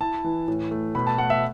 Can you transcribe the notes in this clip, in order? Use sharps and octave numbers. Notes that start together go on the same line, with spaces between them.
E4 A5
E3
A2
A3
B2 B5
A5
A3 F#5
E5